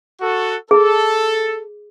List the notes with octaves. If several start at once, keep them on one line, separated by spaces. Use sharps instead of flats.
F#4 A4
G#4 A4